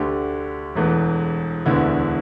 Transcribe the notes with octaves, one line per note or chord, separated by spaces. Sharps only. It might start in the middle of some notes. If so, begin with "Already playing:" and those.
Already playing: D2 D3 A3 G4
E1 E2 E3 A3
E1 D2 D3 B3 E4